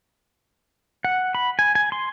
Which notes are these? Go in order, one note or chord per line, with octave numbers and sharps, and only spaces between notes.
F#5
B5
G#5
G#5
C6